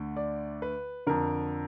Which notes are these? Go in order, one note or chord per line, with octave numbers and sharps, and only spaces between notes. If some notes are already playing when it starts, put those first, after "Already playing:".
Already playing: D2 D3
D5
B4
F2 D3 A#4